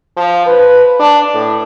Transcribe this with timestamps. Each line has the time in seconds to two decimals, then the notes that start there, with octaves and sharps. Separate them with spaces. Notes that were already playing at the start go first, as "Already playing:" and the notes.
0.17 F3
0.46 B4
1.00 D4
1.34 A2